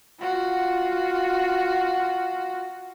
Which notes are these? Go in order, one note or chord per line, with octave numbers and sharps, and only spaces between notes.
F4 F#4